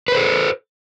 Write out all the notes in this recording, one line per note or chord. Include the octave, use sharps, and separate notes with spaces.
A4 B4 C5